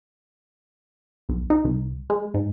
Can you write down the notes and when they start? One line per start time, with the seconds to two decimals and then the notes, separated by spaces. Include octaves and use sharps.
1.29 B1
1.50 D#4
1.64 C2
2.10 G#3
2.34 G#2